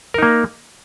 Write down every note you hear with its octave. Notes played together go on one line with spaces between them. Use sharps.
A#3 D#4 A#4